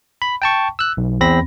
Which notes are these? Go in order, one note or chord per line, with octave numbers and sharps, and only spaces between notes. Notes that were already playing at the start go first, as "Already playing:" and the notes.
B5
G5 A5 C#6
E6 F#6
B1
E2 C4 B5 A#6